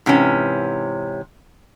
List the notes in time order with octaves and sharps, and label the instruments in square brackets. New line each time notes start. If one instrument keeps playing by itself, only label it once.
[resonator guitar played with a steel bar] G#2 C3 E3 C#4